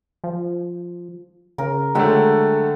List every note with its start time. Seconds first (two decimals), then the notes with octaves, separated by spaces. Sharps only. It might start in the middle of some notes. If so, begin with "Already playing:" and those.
0.24 F3
1.58 C#3 A#4
1.95 D3 F#3 G#3 A3 G5